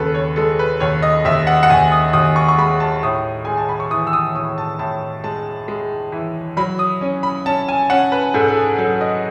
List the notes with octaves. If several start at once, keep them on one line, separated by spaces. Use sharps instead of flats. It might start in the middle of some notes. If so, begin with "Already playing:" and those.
Already playing: D#2 C#3 A4 B4
C#5
G#3 A4
B4
D#2 C#5
D#5
D#2 E5
F#5
F#5
D#2 G#5
D#6
D#2 D#6
C#6
C#6
G#3 B5
A5
A2 D#6
G#3 G#5
A5
B5
C#6
E3 D#6
E6
D#6
A2 D#6
A5
A2 A5
G#3 A5
G#3
E3
F#3 B5
D#6
C#4
B5
C#4 A5
G#5
C#4 F#5
B4
G#2 A4
A4
G#4
F#3 A4
D#5